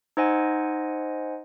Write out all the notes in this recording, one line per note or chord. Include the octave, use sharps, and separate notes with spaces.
D#4 C5 D#5 F#5 G#5